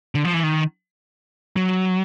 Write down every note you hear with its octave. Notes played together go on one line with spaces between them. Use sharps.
D3
F3
E3
D#3
F#3